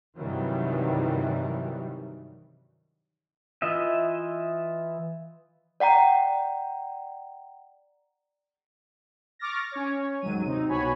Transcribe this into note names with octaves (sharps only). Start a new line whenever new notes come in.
G2 C3 D#3 E3 F#3 G3
E3 F4 D#5 E5
D5 F#5 G5 A#5
C#6 D6 F6 A6 A#6
C#4 C#5
D#2 G#2 F#3 D#7
C3 C4 D#4
C2 B2 F#4 C#5 G#5 B5